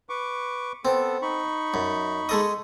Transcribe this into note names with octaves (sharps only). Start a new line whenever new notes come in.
B4 C#6 D6
B3 C4 A4
D#4 B5 C#6
F#2
G#3 A4 D#5